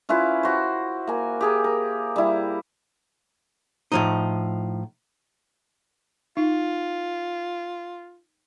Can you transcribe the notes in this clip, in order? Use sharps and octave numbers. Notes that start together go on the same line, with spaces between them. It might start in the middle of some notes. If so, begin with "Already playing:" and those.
C#4 E4 F4 B4
F#4 C5
A#3 G#5
G4 G#4 A#4
A#4
G3 E4
A2 F3 D#4
D#4 F4